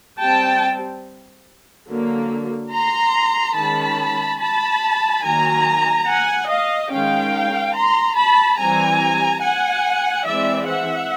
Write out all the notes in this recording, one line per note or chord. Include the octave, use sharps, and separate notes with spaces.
G3 C4 G5 A5
D3 F#3 A#3
A#5 C6
D#3 G#3 C#4 A5 B5
A5 B5
D#3 F#3 A#3 G#5 A#5
F#5 G#5
D#5 F5
D#3 G#3 C#4 F5 G5
A#5 C6
A5 B5
E3 G3 C4 G#5 A#5
F#5 G#5
E3 G#3 C4 D5 E5
E5 F#5